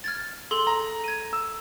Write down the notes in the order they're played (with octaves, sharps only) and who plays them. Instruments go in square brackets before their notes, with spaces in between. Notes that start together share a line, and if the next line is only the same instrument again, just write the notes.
[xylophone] F6 G#6 A6
G#4 A4 C6
[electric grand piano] A#5
[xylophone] G#6 D#7
[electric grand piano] E6